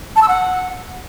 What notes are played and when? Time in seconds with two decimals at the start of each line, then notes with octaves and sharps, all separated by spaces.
0.16 A5
0.22 E6
0.28 F#5